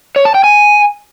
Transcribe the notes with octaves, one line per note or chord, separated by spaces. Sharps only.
C#5
A5
G5
G#5